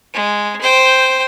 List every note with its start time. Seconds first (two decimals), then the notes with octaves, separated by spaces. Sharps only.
0.14 G#3
0.61 C5 G5